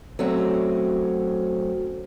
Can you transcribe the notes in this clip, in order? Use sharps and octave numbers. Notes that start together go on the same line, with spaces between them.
F#3 A3 C4 C#4